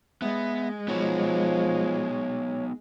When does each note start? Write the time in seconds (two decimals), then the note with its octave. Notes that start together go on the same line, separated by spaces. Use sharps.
0.22 G#3 B3 E5
0.88 F3 B3 D#4 F#4 C#5